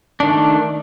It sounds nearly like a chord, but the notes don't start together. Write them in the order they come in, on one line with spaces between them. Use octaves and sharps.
D4 D#3 A3